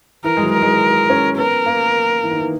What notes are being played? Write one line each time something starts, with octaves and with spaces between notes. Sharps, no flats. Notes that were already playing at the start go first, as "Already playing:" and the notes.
E3 A#4
G#3
F#3
A#4
G#3
C#4
B3 A#4
A#3
E3
D#3
E3